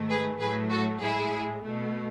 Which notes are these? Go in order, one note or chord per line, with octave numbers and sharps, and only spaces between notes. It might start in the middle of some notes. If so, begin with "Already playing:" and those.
Already playing: G#2 D#3 A3
G#4 B4
A2 F#3 A3 G#4 B4
F#4 A4
A2 G#3 E4 G#4
B2 A3